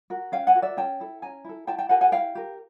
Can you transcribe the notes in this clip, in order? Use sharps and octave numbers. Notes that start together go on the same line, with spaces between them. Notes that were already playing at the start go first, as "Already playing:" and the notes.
F#4 A#4
C#4 F5 G5
F#5 G#5
F#4 A#4
D5 E5
C#4 G5 A5
E4 A4
C#4 G#5 A#5
E4 A4
E4 G5 A5
G5 A5
G4 A#4 F#5 G#5
F#5 G#5
E4 F5 G5
G4 A#4